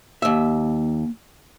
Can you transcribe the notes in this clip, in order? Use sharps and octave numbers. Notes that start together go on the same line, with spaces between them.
D#2 A#3 E5